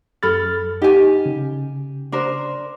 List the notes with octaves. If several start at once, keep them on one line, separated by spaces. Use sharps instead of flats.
F#2 A4 B5 F6 A6
D#4 G4 G#5
C#3
D4 A#4 C5